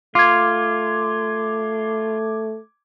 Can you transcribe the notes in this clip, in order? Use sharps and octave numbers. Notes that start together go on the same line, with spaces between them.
A3 F4 D6 G#6